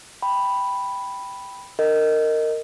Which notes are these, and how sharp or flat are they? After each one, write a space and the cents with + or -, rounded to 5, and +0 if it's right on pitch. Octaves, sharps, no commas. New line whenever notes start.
G5 +0 B5 +0
A#4 -20 D#5 +0